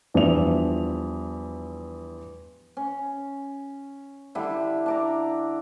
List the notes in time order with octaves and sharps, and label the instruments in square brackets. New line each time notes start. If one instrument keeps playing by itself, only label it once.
[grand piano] E2 F3 G3 D4 E5 F7
[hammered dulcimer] C#4
D3 G3 E4
D4 D5 A#5